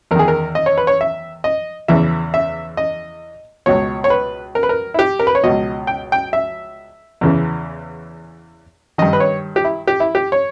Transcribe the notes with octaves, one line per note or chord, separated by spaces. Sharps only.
E2 D#3 G#4 A#4
A#4
D#5
C#5
B4
C#5
E5
D#5
E2 C#3 E3 E5
E5
D#5
C#2 B2 C#5
C#5
B4
A#4
B4
A#4
E4
G4
A#4
B4
C#5
C#2 B2 D#5
G5
G5
E5
E2 C#3 E3
G2 D#3 D#5
B4
C#5
G4
E4
G4
E4
G4
C#5